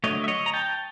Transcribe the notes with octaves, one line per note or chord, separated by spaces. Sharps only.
D3 F#3 A3 C#5 D#5
E5
C#5 D#5
A#5
G5 A5